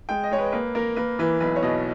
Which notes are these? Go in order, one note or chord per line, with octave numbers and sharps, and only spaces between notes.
G#3 G5
D#5
G#3 C#5
B4
A#3 B4
A#3 A#4
A#3 B4
E3 B4
B1 B4
C#5
B2 D#5